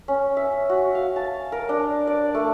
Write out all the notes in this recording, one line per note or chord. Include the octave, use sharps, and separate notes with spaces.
C#4
E5
F#4
F5
A5
A#4
D4
D5
A3